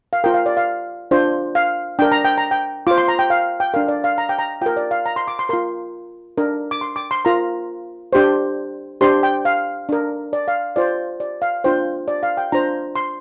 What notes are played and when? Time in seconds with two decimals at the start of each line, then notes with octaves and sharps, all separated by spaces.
0.13 F5
0.24 F4 A#4 G5
0.34 F5
0.46 D5
0.57 F5
1.11 D4 F4 C5
1.55 F5
1.99 D4 A#4 G5
2.12 A#5
2.24 G5
2.38 A#5
2.51 G5
2.87 F4 C5 D6
2.98 C6
3.08 A#5
3.19 G5
3.30 F5
3.60 G5
3.74 D4 A#4 F5
3.88 D5
4.04 F5
4.18 A#5
4.29 G5
4.39 A#5
4.61 F4 A#4 G5
4.77 D5
4.91 F5
5.06 A#5
5.16 C6
5.28 D6
5.39 C6
5.49 F4 A#4 C6
6.38 D4 A#4
6.71 D6
6.81 C6
6.96 D6
7.11 C6
7.25 F4 A#4 A#5
8.13 D4 G4 C5
9.01 D4 G4 C5 C6
9.23 G5
9.45 F5
9.89 D4 A#4
10.33 D5
10.48 F5
10.76 F4 C5 D5
11.20 D5
11.42 F5
11.64 D4 F4 C5 G5
12.08 D5
12.23 F5
12.37 G5
12.52 D4 F4 C5 A#5
12.96 C6